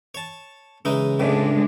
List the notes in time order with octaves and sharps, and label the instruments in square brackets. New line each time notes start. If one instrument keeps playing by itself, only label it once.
[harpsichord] C#5 A5
[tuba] C#3 [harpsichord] E3 G#3 D#4
[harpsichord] C#2 A2 C3 [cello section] G#3 D4